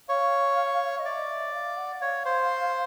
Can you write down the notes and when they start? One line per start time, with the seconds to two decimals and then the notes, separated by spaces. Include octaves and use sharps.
0.09 C#5 F5
0.99 D#5
1.05 D5 E5
1.19 D#5
1.29 E5
1.53 F5
1.77 F#5
2.01 C#5 F5
2.25 C5